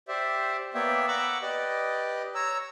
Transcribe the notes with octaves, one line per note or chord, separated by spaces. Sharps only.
G4 C5 D5 E5
A#3 B3 C#5 D5 E5 G5
F#5 A#5 B5 C#6 D6 E6
G4 B4 D5 D#5
C#5 A#5 E6